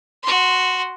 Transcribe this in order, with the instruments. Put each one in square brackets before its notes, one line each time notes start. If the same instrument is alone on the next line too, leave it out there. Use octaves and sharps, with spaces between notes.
[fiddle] F#4 C6